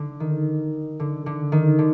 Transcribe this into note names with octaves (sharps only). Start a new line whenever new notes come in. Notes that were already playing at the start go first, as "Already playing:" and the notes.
Already playing: D3
D#3
D3
D3
D#3
D3